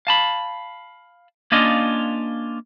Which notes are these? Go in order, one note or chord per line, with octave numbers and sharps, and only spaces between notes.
F5 A5 B5
A#3 C#4 D4 F4 D#5 F5